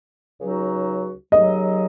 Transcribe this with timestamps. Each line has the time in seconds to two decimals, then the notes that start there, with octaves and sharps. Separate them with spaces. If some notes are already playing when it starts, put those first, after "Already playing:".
0.40 C#2 C#3 F#3 D#4 F#4
1.32 D#2 C#3 F#3 D#5